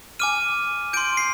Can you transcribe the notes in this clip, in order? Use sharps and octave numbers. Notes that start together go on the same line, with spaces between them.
G#5 D6 F6 D#7
C6 G6 D7
C7